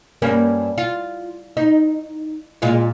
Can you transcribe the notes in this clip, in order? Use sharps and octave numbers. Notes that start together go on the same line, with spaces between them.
G2 A#3 C#4
F4
D#4
A#2 G#3 F4